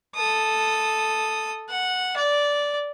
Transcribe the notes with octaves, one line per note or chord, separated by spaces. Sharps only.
A4 D#6
F#5
D5